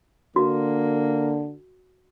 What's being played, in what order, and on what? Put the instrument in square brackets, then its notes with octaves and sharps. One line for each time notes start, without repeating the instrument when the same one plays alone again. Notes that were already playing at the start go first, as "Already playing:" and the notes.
[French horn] D3 [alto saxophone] A#3 [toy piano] F#4